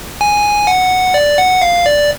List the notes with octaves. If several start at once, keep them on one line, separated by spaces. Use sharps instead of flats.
G#5
F#5
D5
F#5
F5
D5